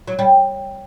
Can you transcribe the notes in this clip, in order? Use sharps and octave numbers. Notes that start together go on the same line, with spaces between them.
F#3
G3